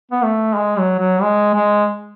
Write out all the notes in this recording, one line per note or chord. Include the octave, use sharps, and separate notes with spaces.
B3
A3
G#3
F#3
F#3
G#3
G#3